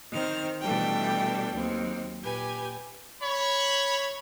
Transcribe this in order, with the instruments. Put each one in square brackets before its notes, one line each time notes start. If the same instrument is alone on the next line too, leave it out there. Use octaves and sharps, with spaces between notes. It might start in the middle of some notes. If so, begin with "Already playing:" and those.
[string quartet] D#3 C4 C5 F6
B2 E3 G3 A3 D4 G5
D#2 F#3 C4
A#2 G4 B4 G#5
[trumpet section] C#5 B5